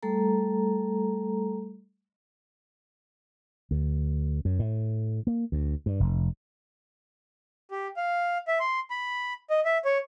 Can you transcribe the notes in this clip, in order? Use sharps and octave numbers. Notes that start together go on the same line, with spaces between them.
G3 A3 A4 A#5
D2
F#2
A2
A#3
D2
G2
F1
G4
F5
E5
C6
B5
D#5
E5
C#5